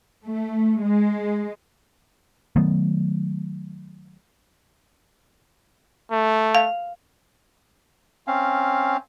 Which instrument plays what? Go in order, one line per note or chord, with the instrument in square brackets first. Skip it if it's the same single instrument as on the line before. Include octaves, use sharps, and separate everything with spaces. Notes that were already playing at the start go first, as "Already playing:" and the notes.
[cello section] A3
G#3
[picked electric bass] D#3 F#3 A3 B3
[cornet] A3
[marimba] F5
[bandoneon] C4 C#4 F5